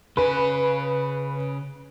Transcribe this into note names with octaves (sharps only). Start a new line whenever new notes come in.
C#3 C#4 B4 G#5